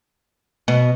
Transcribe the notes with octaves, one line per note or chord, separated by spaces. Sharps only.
B2